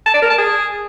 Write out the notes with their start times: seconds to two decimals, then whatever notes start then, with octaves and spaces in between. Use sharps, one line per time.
0.06 A5
0.14 D5
0.22 A#4
0.30 A5
0.38 G#4